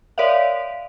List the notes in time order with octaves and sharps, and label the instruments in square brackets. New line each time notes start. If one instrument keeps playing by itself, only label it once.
[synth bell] A#4 C#5 D5 E5 F5